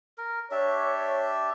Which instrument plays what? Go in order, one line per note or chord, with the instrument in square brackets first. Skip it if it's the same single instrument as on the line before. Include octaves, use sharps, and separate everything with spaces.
[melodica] A#4
[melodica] D4 G4 E5 [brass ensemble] C#5